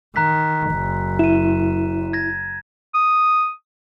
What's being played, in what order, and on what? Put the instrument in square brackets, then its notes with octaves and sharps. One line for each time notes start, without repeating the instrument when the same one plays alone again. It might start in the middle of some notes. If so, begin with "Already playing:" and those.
[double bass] D#3 [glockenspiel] A#5 F#6 B6
[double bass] F#1 F#2
[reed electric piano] E4 [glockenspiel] D#7 E7
[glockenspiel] G#6 A#6
[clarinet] D#6